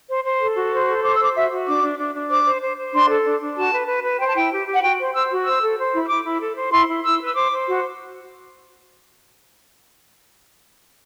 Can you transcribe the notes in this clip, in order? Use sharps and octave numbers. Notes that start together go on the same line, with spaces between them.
C5
C5
A4
F#4
C5
A4
C5 D6
E6
C5 D6
F#4 E5
F#4
D4 D6
D4
D4
D4
C5 D6
C5
C5
C5
D4 C6
A4
D4
D4
F#4 A5
B4
B4
B4
C5 G5
A5
E4 G5
G4
G4
F#5
F#4 G5
C5
C5 E6
F#4
C5 E6
A4
C5
E4
E6
E4 D6
E4
A4
C5
E4 C6
E4
E4 E6
B4
E6
C5 D6
C5
F#4